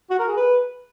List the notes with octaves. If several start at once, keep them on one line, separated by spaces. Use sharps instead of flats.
F#4
A#4
G#4
B4